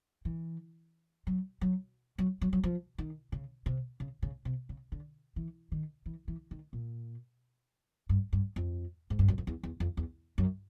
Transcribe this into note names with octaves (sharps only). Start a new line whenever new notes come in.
E3
F#3
F#3
F#3
F#3
F#3
F3
D#3
C#3
C3
C#3
C#3
C3
C#3
D3
E3
D#3
E3
E3
D#3
A#2
G2
G2
F2
G#2
G2
F#2
F2
E2
E2
F2
E2
F#2